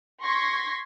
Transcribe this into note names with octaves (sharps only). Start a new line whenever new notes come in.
C6 C#6 G#6 A#6 B6